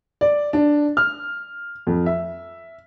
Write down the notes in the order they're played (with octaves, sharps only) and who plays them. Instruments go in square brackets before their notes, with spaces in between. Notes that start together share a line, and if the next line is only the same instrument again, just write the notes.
[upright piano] D5
D4
F6
F2
E5